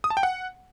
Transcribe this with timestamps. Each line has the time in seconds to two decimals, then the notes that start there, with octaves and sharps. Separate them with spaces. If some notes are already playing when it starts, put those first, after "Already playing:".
0.04 D#6
0.10 A5
0.17 G5
0.23 F#5